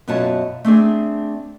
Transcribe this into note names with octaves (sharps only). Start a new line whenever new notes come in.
F#2 B2 F4 F#4 C#5 A5
A3 C4 D4 G#4